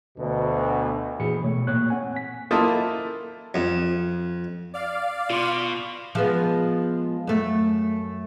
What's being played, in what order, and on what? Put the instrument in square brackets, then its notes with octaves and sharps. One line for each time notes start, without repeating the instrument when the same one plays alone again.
[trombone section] D2 B2
[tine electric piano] A#2 E3 G#4 B5 C#7
B2 A3 C#5
A#2 A#3 C#5 F#6
C4 F#5 G#5
B6
[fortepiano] A#3 E4 F4 A4 C5 D#5
[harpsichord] F2
[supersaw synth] D5 F5
[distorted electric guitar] B2 [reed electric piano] F4 C6
[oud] F3 G#3 B3
F#2 A3